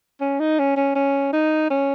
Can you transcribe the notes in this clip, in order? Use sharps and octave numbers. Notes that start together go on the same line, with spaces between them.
C#4
D#4
C#4
C#4
C#4
D#4
C#4